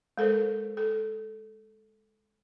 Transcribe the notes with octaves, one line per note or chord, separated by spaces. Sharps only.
G#3 A4 A#4 C5
A4